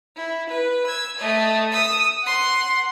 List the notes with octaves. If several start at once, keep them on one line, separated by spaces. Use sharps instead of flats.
E4
B4
E6 G#6
A3 D#5
D#6 E6
F#5 C6